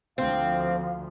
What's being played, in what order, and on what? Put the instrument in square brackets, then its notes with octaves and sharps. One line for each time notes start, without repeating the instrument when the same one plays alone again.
[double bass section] D2 F3 [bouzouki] C4 [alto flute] F5